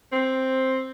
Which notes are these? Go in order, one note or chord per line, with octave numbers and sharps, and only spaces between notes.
C4